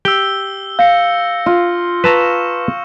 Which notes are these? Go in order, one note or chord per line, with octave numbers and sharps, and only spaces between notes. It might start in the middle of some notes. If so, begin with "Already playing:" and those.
G4 E6 G7
F5 G6 A#6 C#7
F4
B4 A5 A#5 C#6 E6 E7